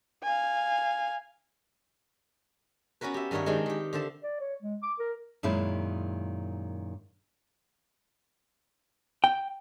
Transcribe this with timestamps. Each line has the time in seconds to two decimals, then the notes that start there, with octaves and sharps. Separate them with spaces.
0.23 F5 G#5
3.01 B3 C#4 F#4 A#4 B4
3.14 G4 E5
3.31 G2 D#3 G3 A#4 C#5 F#5
3.46 D#3 G#3 C4 D4 D#4
3.66 D#3 G4
3.93 D3 C5 E5 A5
4.23 D5
4.41 C#5
4.62 G#3
4.83 D6
4.99 A#4
5.43 F#2 A#2 D#3 G#3 E4
9.24 G5